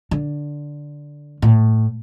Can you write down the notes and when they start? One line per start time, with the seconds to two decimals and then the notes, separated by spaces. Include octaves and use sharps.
0.11 D3
1.42 A2